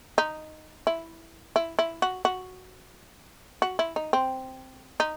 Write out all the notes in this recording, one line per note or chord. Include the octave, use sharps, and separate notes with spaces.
D#4
E4
E4
E4
F#4
F#4
F#4
E4
D#4
C4
D#4